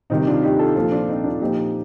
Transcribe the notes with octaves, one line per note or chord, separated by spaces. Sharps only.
C3 D#3 G3 C4 D#4
D4 F4
D#4 G4
F4 A4
A#2 F3 F4 A4
D4 F4
C4 D#4
D4 F4
A#2 F3 D#4 G4